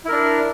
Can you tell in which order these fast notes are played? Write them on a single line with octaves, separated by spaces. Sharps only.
E4 A#4 D4